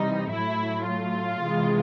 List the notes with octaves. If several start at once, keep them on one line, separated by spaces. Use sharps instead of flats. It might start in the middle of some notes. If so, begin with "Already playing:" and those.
Already playing: C3 E3 G3 D#4
A2 F#3 A3 E4
F4
C3 E3 G#3